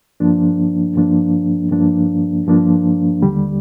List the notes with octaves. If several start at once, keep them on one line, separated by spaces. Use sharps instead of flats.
G2 F3 A#3 D4
G2 F3 A#3 D4
G2 F3 A#3 D4
G2 F3 A#3 D4
D#2 D3 G3